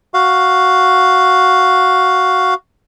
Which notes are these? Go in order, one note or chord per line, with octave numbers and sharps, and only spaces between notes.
F#4 F5